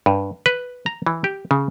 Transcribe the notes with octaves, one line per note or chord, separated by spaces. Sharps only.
G2
B4
A#5
E3
G4
C#3